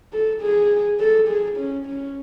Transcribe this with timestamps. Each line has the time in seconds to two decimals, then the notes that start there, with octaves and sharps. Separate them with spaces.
0.13 A4
0.42 G#4
0.99 A4
1.28 G#4
1.57 C#4
1.86 C#4